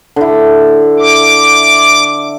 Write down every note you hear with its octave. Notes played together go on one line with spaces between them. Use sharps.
D3 E4
D6